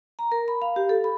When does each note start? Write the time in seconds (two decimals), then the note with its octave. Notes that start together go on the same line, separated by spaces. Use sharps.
0.19 A#5
0.32 A#4
0.48 B5
0.62 F5
0.76 G4
0.89 A4
1.04 B5